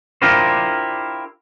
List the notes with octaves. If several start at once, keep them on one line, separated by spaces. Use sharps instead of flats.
D4 E4 F4 G4 A#4 C5